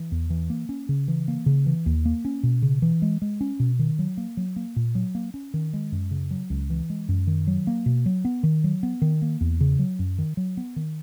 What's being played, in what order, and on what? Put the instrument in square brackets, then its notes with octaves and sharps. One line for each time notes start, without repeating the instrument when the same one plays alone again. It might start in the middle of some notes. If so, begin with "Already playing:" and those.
Already playing: [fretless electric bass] E3
E2
E3
A#3
C#4
C#3
E3
A#3
C#3
E3
D#2
A#3
C#4
B2
C#3
E3
G#3
G#3
C#4
B2
D#3
F#3
A#3
F#3
A#3
A#2
F#3
A#3
C#4
D#3
G#3
F#2
C#3
F#3
C#2
E3
G#3
F#2
D#3
F#3
A#3
B2
F#3
B3
D#3
F#3
B3
D#3
A#3
E2
C#3
F#3
F#2
D#3
F#3
B3
D#3